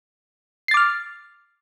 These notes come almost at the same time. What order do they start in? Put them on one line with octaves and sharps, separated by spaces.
C7 A6 D6 F6